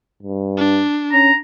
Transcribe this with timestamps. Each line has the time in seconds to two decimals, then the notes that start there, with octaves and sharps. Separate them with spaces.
0.23 G2
0.57 D4
1.12 C#4 A#5